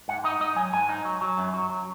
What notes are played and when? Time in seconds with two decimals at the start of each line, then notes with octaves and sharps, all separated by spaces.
0.08 G#2 F#5
0.24 D#4 D#5
0.40 G#2 D#5
0.56 F#3 G#5
0.73 G#2 G#5
0.89 D#4
1.05 F#3
1.21 F#3
1.38 F#2
1.54 F#3
1.70 F#3